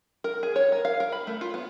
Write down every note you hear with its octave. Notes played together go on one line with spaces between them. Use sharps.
A#4
G#4
C#5
A#4
F5
A#4
B5
A3
F4
B3